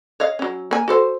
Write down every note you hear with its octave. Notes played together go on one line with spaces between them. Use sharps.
C#5 D#5 F5
F#3 C#4
A#3 G#5
F#4 A4 C5